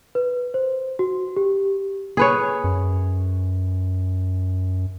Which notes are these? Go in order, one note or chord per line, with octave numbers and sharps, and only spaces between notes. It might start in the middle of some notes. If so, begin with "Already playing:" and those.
B4
C5
F#4
G4
G#4 B4 C#5
F#2